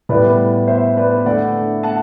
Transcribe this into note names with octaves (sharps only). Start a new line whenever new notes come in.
A2 G3 B3 B4 D5
C5 E5
B4 D5
D3 A3 E4 D5 F#5
F#5 A5